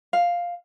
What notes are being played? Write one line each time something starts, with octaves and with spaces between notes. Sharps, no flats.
F5